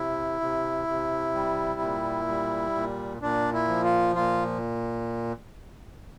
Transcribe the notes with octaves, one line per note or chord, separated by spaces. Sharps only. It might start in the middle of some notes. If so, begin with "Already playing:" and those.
Already playing: C3 E4
C3
C3
G3
A#2
G3
A#2
A#2 D4
E4
F3
F4
A#2 F4